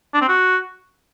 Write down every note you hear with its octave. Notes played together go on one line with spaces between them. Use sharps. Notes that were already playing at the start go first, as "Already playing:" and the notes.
D4
C4
F#4